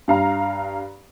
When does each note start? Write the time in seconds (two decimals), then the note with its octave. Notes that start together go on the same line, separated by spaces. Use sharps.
0.08 G2 F5 A#5